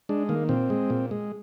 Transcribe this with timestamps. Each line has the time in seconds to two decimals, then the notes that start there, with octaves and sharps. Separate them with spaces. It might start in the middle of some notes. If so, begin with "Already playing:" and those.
0.09 G#3 D4
0.29 D#3 A#3
0.49 A#2 C4
0.70 G#3
0.90 A#2
1.11 G#3